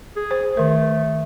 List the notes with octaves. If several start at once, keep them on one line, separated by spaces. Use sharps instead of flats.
G#4
C5
D#3 A3 A#4